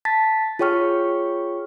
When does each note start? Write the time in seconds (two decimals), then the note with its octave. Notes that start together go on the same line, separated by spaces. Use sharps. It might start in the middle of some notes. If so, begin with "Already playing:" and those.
0.05 A5 A6 B6
0.59 F4 G#4 C#5 G5 C#6 F6